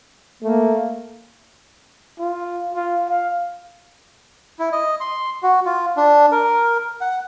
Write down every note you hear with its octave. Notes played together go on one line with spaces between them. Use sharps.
A3 A#3
F4
F4
F5
E4
D#5
C6
F#4
F4
D4
A#4
F#5